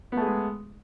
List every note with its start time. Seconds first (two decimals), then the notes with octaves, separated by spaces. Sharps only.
0.12 B3
0.17 A3
0.21 G#4
0.26 G#3